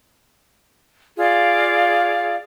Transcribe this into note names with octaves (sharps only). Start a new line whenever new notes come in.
F4 G#4 D5 F5